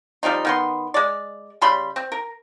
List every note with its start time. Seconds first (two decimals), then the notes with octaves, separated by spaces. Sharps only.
0.23 F3 G3 C4 D#4
0.45 D#3 B3 C6
0.94 G#3 D5
1.62 C#3 G3 B5 C6
1.96 C4
2.12 A#4